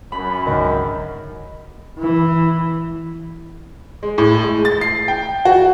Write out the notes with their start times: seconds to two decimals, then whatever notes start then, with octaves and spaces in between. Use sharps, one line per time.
0.12 F#2 B5
0.46 C#2 G#2 D3 D#3
1.99 E3
4.03 G#3
4.18 A2
4.43 G#3
4.65 A6
4.81 C7
5.08 G5
5.45 F#4